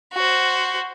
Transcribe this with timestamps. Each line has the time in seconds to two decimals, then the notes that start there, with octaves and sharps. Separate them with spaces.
0.14 F#4 C5